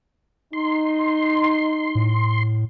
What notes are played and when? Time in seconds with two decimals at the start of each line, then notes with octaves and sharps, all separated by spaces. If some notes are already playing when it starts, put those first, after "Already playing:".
0.53 D#4 C6
1.95 A2